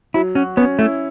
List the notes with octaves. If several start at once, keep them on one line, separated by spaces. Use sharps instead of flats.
F#3 E4
C#4 F#4
B3 C#4
A3 E4